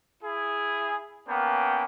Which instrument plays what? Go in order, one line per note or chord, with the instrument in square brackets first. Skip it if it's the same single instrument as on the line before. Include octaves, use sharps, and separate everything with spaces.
[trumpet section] E4 G#4
A#3 B3 C#4 G5